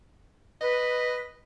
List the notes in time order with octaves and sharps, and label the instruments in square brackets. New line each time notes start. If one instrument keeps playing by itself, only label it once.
[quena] B4 [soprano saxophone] D#5